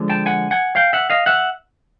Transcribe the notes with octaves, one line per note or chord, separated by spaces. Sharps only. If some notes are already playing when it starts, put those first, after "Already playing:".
Already playing: D3 F3 G#3
G5 A5
F#5 G#5
F#5 G#5
F5 G5
E5 F#5
D#5 F5
E5 F#5